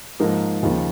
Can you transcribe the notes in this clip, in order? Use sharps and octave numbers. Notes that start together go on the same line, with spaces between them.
G#2 F3 A#3
D#2 C#3 F3